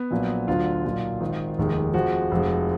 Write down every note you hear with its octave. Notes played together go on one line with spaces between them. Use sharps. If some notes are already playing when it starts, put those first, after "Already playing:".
Already playing: B3
A#1 A#2 F#3
D2 D3 F#3 F4
B1 A#2 F#3
G#1 G#2 D#3
F1 D#2 D#3 G#3
F2 F3 G#3 F#4
F1 F2 F3 G#3